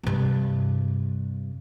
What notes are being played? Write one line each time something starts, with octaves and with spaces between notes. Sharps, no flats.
G2 C3